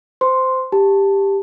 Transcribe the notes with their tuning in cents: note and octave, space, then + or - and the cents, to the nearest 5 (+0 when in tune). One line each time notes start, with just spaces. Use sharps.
C5 -15 C6 +0
G4 +10 A5 +5